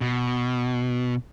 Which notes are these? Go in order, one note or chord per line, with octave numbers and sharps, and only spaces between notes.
B2